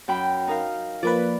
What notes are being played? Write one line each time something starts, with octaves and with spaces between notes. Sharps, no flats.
F#2 G5 B5
D#4 A#4 F5
F3 A#3 B4 D5 B5